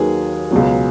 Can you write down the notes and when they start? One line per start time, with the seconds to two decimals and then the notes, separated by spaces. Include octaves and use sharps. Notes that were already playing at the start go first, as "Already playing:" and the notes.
Already playing: D#2 D#3 F#3 G#4 B4
0.51 C#2 B2 F#3